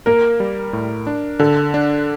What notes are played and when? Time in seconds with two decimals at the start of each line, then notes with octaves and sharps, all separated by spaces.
0.06 A#3 A#4
0.40 G3
0.73 A2
1.07 D4
1.39 D3 A4
1.74 D4